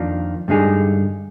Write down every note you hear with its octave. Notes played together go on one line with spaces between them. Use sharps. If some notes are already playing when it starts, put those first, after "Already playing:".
Already playing: F2 D#3 A#3 D4 F4
G2 D3 G#3 D#4 G#4